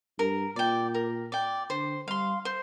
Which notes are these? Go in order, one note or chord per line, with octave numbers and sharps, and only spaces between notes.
G2 A#4
A#2 D5 G5
A#4
D5 G5
D3 C5
G3 F5 C6
C5